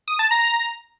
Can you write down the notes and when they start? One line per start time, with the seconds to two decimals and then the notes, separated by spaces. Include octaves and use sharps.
0.08 D#6
0.19 A5
0.31 A#5